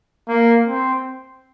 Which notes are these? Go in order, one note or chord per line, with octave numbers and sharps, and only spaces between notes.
A#3
C4